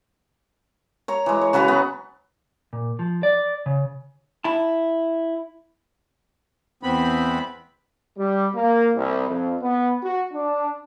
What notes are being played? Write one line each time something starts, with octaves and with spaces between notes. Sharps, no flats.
C#5 A#5
E3 G#3
C#5
C#3 F#3 B4 A#5
B3
A#2
F3
D5
C#3
E4 A5
E2 B3 C4 B5
G3
A#3
C2
F2
B3
F#4
D4